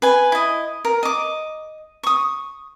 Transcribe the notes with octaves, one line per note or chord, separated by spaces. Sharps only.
B4 G#5
E4 D#5
A#4
D#5 D6
C#6 D#6